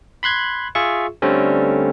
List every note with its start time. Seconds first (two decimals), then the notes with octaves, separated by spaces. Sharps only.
0.23 B5 C6 F#6 G#6
0.75 F4 G#4 E5 C#6
1.22 D3 G3 A3 C4 C#4